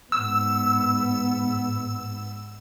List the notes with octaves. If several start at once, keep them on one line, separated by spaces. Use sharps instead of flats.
G#2 B3 E6